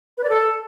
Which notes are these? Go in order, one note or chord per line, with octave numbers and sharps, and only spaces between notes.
B4
D5
A4